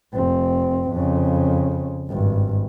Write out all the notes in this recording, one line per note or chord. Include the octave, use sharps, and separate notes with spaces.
F1 C4
F2 C#3
G#1 G2